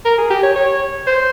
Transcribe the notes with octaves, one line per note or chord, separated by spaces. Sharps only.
A#4
G#4
G4
C#5
C#5
C5